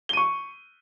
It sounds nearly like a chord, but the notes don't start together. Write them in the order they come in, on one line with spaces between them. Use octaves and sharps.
G7 D#7 C#6